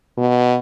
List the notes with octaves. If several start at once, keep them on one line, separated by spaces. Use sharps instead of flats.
B2